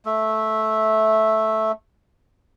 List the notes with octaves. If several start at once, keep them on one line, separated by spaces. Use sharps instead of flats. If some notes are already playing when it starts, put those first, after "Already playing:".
A3 E5